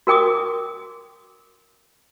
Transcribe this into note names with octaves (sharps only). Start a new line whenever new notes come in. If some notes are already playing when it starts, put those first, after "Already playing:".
F#4 A#4 G5 D6 D#6